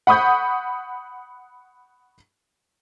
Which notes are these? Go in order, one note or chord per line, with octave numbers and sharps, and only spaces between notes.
F#5 B5 C#6 D#6 G6